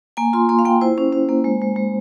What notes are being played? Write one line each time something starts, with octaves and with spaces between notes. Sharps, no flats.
A#3 G#5
F4 C6
A#3 C6
F5
A#3 G5
E4 C5
C#4
C#4
A#3
G#3
G#3
G#3